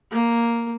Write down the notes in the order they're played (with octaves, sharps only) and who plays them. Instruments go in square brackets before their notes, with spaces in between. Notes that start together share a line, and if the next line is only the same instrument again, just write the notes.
[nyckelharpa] A#3